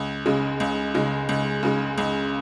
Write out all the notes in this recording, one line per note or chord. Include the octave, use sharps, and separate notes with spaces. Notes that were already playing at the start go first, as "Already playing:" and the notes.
Already playing: C#2
C#3 G#3
C#2
C#3 G#3
C#2
C#3 G#3
C#2